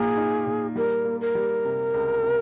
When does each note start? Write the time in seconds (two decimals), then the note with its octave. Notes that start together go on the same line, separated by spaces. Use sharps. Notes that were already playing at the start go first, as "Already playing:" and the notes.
Already playing: A#2 A#3 D#4 G#4
0.17 D#4
0.46 A#2
0.76 G3 A#4
1.05 A#3
1.21 A#4
1.35 G3
1.65 C3
1.94 C#2
2.23 C3